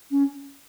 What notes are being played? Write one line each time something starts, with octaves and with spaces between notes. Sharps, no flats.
C#4